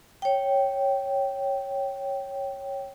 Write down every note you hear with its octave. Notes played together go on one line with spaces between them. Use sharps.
C#5 G5